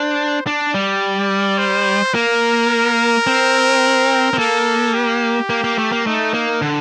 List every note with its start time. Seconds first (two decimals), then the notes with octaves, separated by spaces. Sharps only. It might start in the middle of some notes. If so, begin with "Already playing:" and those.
Already playing: D4 C5
0.46 D4 D5
0.74 G3
1.58 C5
2.14 A#3 A#4
3.27 C4
4.33 C4
4.38 A#3 A4
4.94 G4
5.50 A#3
5.64 A#3
5.78 A3
5.92 A#3
6.06 A3 D#4
6.34 A#3
6.62 D3